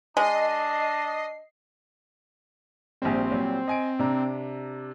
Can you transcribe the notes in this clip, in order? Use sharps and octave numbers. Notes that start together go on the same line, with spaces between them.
G#3 D4 D#5 C7
A#1 A#2 G3 C4
A#2 F#3 G3
D#5 G#5 D7
C3 D4 A#5